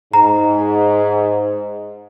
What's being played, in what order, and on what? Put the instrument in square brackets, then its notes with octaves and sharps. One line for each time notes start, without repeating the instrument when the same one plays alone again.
[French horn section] G#2 [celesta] A#5